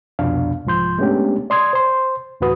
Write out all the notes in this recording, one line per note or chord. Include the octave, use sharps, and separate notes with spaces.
C2 F2 B2 D4 F5
C2 G#2 F3 C6 G6
G#3 A3 B3 C#4 D4 G4
D5 C6 D#6 G#6
C5 C6
D2 A2 E3 F#4 B4 D#6